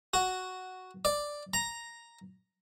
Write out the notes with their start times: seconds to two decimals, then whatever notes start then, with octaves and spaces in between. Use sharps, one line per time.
0.14 F#4
1.05 D5
1.54 A#5